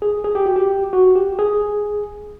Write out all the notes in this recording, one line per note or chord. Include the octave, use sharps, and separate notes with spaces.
G#4
G#4
G4
F#4
G4
F#4
G4
G#4